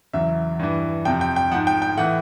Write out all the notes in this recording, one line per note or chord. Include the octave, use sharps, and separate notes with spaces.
E2 C#3 F#3 E5
G2 E3
F2 C3 F3 G5
G5
G5
G#2 F3 F#5
G5
G5
A2 E3 F#5